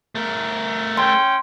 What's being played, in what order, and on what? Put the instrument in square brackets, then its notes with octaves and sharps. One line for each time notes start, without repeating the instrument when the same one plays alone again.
[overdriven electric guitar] A3 A#4
[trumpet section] C#4 G5 [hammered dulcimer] C6